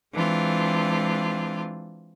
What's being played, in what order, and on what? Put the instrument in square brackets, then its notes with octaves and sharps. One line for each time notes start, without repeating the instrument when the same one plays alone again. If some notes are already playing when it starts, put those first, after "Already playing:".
[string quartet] E3 G#3 C4 D4 F4